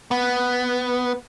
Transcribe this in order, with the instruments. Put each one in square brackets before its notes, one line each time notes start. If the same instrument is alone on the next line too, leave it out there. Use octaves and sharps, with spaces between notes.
[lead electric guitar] B3